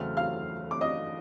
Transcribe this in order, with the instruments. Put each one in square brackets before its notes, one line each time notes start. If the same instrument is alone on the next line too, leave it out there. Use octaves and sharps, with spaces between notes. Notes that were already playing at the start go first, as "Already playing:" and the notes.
Already playing: [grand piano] E2 C#3 F#3 A3 C4 [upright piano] F6
[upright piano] F5 F6
D6
D#5 D#6